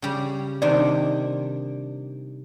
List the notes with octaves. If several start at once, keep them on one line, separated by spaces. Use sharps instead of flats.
C#3 G3
C3 D#3 D4 D5